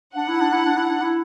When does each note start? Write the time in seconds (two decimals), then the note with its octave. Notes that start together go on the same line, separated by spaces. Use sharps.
0.16 D4 F#5
0.28 E4
0.41 D4
0.53 E4
0.66 D4
0.78 E4
0.90 D4
1.02 E4